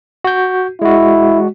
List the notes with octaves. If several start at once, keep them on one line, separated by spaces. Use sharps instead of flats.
F#4 G6
G#3 E4 F#4